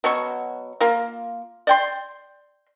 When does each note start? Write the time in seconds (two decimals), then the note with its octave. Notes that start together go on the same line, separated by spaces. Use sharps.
0.04 B2 F#3 C#6
0.81 A#3 F4
1.67 D5 G5 C6